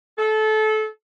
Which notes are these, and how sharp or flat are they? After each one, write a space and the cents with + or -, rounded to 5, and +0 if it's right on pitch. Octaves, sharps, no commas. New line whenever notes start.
A4 -25